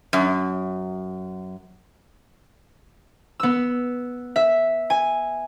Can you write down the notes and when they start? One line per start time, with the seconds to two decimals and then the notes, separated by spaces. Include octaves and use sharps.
0.13 F#2
3.40 B3 E6
4.36 E5
4.90 G#5